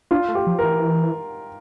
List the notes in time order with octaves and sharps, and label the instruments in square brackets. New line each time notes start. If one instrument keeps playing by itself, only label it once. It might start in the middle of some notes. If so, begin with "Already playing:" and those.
[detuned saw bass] D4 [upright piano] F4
[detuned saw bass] A3
[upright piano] G4
[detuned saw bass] F3
[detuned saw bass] E3 [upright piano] A#4